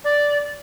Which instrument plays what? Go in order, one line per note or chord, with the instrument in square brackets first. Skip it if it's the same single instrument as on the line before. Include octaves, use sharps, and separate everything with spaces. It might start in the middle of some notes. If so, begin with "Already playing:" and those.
[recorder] D5